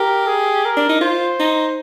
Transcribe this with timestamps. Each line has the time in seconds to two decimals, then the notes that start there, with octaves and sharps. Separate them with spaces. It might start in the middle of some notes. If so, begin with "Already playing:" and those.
Already playing: G4 A#4
0.27 G#4
0.65 A#4
0.77 D4
0.89 D#4
1.01 F4 C5
1.39 D#4